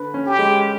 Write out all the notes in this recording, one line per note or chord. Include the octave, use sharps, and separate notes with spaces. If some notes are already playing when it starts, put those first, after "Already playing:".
Already playing: D3 B4
C#4
G4
G#3